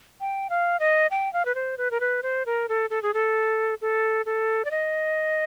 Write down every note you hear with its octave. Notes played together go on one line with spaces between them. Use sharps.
G5
F5
D#5
G5
F5
B4
C5
B4
A#4
B4
C5
A#4
A4
A4
G#4
A4
A4
A4
D5
D#5